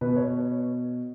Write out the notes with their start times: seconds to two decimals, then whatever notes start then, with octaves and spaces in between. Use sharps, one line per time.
0.01 B2 B4
0.16 C#5